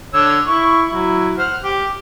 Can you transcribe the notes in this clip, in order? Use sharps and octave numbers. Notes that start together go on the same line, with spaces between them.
D3 C#5 E6
E4 C#6
F#3 E4
C5 F#5 F6
G4